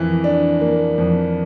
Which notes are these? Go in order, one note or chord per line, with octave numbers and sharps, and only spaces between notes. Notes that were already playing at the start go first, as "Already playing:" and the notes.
Already playing: F2 E3 A#3
D4
A#3
F2